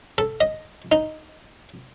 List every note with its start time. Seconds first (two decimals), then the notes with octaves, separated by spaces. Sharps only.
0.18 A4
0.41 D#5
0.92 D#4